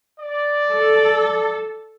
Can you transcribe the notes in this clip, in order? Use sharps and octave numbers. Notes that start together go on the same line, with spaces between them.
D5
A4